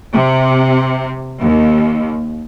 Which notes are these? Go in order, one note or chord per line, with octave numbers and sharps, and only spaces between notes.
C3
D#2